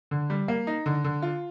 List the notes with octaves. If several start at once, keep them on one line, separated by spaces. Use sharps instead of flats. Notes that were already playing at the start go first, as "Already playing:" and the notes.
D3
G3
A#3
D#4
D3
D3
F4